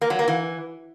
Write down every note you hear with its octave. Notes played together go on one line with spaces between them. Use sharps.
A#3
F#3
A#3
E3